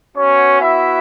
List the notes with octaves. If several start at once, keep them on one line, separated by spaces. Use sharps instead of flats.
B3 C#4 F#4 C#5
E4 E5